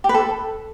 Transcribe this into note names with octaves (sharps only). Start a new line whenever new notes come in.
G4
B4
A4